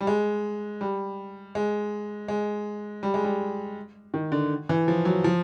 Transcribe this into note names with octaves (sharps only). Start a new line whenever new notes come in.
G3
G#3
G3
G#3
G#3
G3
G#3
G3
D#3
D3
E3
F3
F#3
F3